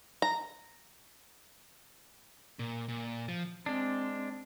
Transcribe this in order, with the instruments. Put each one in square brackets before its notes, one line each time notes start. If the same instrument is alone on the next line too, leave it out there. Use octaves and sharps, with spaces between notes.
[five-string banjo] A#5
[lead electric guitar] A#2
A#2
F3
[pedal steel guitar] G#3 D4 [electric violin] C4